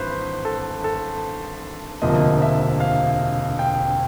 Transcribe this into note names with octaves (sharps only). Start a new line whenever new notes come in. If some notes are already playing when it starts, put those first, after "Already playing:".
Already playing: G#1 G2 E3 B4 C5
A4
A4
E1 D2 C3 F3 A#3 D#5
E5
F5
G5